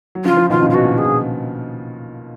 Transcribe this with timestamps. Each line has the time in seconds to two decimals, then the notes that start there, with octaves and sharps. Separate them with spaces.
0.15 F#3
0.25 C#3 F3 F4
0.37 C#3 F3
0.50 B2 D#3 F4
0.62 A#2 C#3
0.70 F4
0.74 B2 F#4
0.84 A#2
0.98 G#4
1.05 A#2